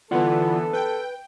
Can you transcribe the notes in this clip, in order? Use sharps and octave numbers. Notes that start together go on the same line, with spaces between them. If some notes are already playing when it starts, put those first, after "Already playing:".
D3 E3 B3 F4 A4 D5 F#5
B4 G5